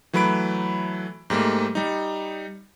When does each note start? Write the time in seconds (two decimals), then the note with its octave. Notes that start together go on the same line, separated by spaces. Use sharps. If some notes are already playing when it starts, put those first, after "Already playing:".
0.13 E3 F#3 A3 B4 B5 D7
1.30 G#2 G3 A3 A#3
1.75 G3 D#4